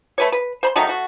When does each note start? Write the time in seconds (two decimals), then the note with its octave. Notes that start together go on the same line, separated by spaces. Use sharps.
0.18 A3 B4 C#5
0.32 B4
0.63 C5 B5 C6
0.76 D#3 F#3 A3 D#4
0.87 A3 F#4